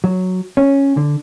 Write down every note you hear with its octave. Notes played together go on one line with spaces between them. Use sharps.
F#3
C#4
D3